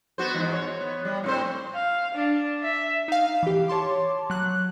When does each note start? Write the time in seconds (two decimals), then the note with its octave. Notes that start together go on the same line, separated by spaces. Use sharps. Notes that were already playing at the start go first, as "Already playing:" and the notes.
0.18 B3 F#4 C5
0.34 E2 G#2
0.53 C#5
0.81 B3
1.05 G3
1.24 A2 C4 C5
1.74 F5
2.15 D4
2.63 E5
3.08 D#4 F5
3.43 E3 G4
3.68 C#5 A5 C6 D6
4.30 F#3 F#6